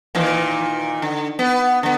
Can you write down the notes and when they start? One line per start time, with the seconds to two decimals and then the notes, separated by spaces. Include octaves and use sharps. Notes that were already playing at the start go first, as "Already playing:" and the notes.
0.15 A#2 D#3 E3
1.02 D3
1.39 B3
1.83 D3 B3